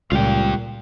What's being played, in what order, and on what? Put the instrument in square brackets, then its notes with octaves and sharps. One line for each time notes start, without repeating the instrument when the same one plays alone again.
[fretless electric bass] C#2 [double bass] A#2 [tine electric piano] G3 G4 [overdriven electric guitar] F4 G5